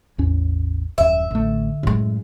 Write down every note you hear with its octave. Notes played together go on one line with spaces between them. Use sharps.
A1 E2 C#4
D#1 F#2 E5
A1 D3 A3
F#2 A2 G#3